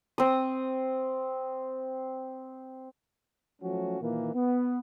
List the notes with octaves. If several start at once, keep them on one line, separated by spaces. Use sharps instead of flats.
C4 D#6
F3 F#3 A3 C#4 F#4
A#2 D#3 E3 A#3
B3